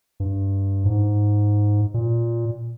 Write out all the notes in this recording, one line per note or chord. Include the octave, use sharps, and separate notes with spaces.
G2
G#2
A#2